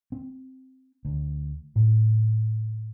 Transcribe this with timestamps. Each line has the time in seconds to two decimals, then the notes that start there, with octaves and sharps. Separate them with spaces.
0.12 C4
1.05 D2
1.76 A2